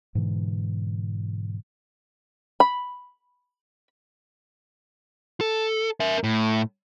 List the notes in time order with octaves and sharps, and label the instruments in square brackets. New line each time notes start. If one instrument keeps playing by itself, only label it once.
[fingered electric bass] G#2 B2 D3 E3
[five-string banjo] B5
[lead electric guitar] A4
A#4 E5
A2